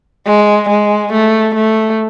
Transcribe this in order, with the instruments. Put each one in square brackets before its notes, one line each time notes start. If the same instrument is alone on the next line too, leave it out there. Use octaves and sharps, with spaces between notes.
[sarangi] G#3
G#3
A3
A3